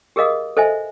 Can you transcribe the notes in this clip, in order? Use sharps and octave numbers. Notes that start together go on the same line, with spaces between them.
G4 G#4 A#4 D#5 F5 D#6
A4 C5 D#5 E5 G#5